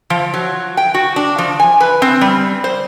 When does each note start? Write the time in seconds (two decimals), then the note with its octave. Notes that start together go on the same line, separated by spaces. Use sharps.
0.10 F3
0.34 F#3
0.77 G5
0.94 F#4
1.16 D4
1.38 F3
1.60 G#5
1.80 B4
2.02 C4
2.21 G3
2.64 C5